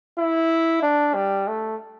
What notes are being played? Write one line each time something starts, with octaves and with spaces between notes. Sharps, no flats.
E4
D4
G3
A3